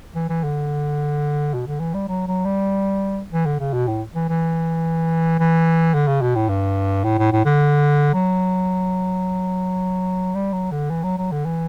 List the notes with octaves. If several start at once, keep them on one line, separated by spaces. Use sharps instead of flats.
E3
E3
D3
B2
D3
E3
G3
F#3
F#3
G3
E3
D3
C#3
B2
A2
E3
E3
E3
D3
C#3
B2
A2
G2
A2
A2
A2
D3
F#3
G3
F#3
D3
E3
F#3
F#3
D3
E3